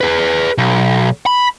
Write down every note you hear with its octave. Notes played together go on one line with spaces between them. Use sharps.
G#4 B4
B1
B5